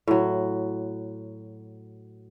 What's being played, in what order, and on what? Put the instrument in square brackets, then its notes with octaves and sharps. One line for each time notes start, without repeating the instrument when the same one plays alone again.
[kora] A2 F#3